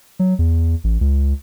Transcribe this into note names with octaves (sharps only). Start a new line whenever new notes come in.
F#3
E2
A1
C#2